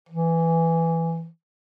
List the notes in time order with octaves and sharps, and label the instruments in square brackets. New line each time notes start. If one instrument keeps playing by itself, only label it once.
[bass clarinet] E3